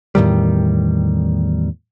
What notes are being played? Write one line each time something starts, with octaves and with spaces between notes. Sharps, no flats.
E2 A2 D#3 G3